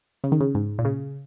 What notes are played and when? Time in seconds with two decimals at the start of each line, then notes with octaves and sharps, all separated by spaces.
0.24 C#3
0.32 D#3
0.40 C#3
0.55 G#2
0.78 A#2
0.85 C#3